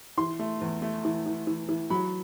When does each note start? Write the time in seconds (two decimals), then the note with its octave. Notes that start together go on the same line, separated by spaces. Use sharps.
0.18 E3 C6
0.39 A3
0.61 E2
0.82 A3
1.05 E3
1.26 E3
1.47 E3
1.69 E3
1.90 F#3 B5